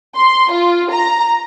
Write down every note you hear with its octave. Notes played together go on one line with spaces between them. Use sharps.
C6
F4
A#5